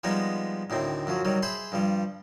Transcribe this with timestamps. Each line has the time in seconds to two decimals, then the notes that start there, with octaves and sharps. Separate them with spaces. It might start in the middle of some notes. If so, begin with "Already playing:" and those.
0.04 F3 G3 G#3 B3 D#4
0.70 D2 A2 D#3 C4
1.07 F#2 F3 F#3
1.25 D#3 F#3 G3
1.42 G#4 C5 E5 B5
1.72 G2 F3 G3